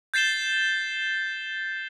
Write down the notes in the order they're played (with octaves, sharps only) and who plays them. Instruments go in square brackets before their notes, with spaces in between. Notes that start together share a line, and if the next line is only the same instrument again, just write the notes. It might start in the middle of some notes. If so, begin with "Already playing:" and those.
[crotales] G6 A6 C7 E7 G7